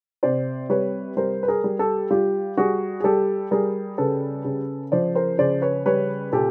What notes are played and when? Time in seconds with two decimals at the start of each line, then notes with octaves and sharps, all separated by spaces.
0.23 C3 C5 D5
0.70 G3 B4 C#5
1.17 G3 A#4 C5
1.43 B4
1.48 G#4 A#4
1.64 G3
1.79 G4 A4
2.10 G3 F4 G4
2.57 G3 F#4 G#4
3.00 G#4
3.04 G3 G4 A4
3.51 G3 G#4 A#4
3.98 C#3 A4 B4
4.45 C#3
4.92 F3 C5 D5
5.15 A#4 C5
5.39 C#3 C5 D5
5.62 B4 C#5
5.86 G3 B4 C#5
6.32 A#2 G4 A4